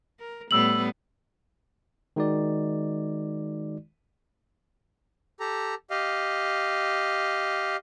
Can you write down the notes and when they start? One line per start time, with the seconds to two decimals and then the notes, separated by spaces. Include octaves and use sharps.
0.19 A#4
0.51 A2 G3 B3 E6 F#7
2.16 D#3 G#3 D#4 F#4 D5
5.40 G4 A4 A#5
5.90 G4 D#5 F5